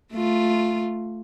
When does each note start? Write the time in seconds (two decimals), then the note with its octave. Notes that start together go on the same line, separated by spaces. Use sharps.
0.13 A3 F4